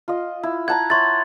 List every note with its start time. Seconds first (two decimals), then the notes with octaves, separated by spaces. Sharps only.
0.08 F4 D#5
0.43 E4
0.68 F#5 A5 A#5 G#6
0.90 C#5 E5 C6 A6